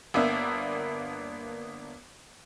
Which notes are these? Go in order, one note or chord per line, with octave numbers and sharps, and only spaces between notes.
G1 A#3 B3 D4 E5